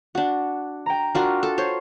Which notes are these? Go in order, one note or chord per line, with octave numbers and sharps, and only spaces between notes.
D4 F#4 F#5
G5 A#5
D4 F4 F#4 A#4
A4
C5 C#5